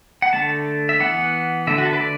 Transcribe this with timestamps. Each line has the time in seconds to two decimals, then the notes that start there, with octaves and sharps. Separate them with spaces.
0.22 F#5
0.33 D3 A3 A5
0.89 E5
1.00 E3 B3 F#5
1.67 D3 A3 E5
1.78 F#4
1.86 A4
1.93 B4
2.01 D5